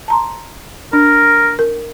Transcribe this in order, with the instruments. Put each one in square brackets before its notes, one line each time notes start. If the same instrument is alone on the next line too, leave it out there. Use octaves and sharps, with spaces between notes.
[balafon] A5 A#5 C6
[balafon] D4 [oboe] A#4
[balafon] A#4